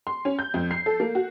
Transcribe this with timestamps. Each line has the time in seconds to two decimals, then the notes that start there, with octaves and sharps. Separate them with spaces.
0.07 C6
0.25 C#4
0.39 G6
0.54 F2
0.71 C7
0.86 A4
1.00 A#3
1.15 F#4